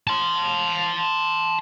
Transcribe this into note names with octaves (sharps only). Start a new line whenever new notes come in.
A5 C6